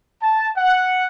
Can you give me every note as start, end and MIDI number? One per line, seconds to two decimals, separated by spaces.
0.21 0.49 81
0.57 1.07 78